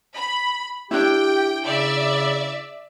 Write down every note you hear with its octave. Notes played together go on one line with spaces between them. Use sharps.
B5
D4 E4 G4 G5
C#3 D5 E5